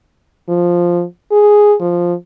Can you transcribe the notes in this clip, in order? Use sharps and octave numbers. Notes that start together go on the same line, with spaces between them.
F3
G#4
F3